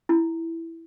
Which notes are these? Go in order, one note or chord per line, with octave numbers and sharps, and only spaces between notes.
E4